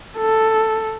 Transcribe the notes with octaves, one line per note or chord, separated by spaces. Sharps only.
A4